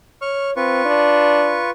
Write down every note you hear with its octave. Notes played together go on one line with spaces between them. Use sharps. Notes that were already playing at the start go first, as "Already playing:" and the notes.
C#5 C#6 F6
C4 F4 B4 C#6
D4